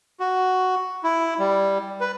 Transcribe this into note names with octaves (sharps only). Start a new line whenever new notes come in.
F#4
E4
G3
B4